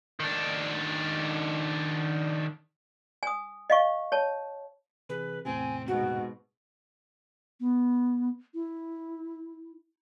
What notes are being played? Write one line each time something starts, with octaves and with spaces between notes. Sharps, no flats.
D#3 D4
G#5 D#6
D#5 F5 C#6
C#5 A5
C3 E3 G#4 B4
E2 A2 C3 C4 G#5
G#2 B2 F#4
B3
E4